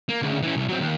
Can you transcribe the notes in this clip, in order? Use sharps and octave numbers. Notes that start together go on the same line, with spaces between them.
A#3
D2 C#3
E3 C#4
C2
F#3 C4
D#2